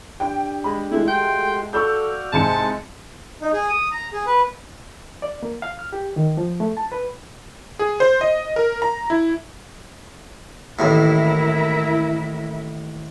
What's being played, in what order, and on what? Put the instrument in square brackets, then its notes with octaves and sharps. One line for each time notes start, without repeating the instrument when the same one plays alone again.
[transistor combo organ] D4 G4 [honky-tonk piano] G5
[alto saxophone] G#3 [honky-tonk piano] B5
[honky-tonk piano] G#3 A3 [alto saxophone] E4
[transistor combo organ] F#4 G4 C6 [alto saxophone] G5
[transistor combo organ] F#4 D5 F5 [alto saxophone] A4 [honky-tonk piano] C#6 E6 G6
[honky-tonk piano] C2 G#2 C#7 [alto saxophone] A5
[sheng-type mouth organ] D#4
G#4
D#6
A#5
G#4
B4
[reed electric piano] D5
A#3
F5
F6
G4
D#3
F3
A3
A5
B4
[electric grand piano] G#4
C5
D#5
A#4
A#5
E4
[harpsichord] A1 D#2 A2 [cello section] E4 A#4 E5